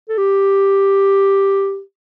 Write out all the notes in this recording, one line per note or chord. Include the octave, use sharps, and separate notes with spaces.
A4
G4